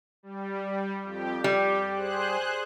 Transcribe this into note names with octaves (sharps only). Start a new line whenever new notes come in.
G3
F2 G4
G3 G4
G#4 C5 F#6